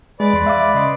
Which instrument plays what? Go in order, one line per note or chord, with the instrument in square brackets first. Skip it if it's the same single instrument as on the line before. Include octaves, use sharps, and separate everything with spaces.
[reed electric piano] G#3 [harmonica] B4 D5
[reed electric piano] E2 C6
E5 F5 D6
C#3 D#5 C6